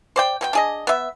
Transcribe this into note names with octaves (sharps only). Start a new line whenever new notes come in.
C5 D5 G5
B2 C4 G5
D4 G#4 D#5
B3 E5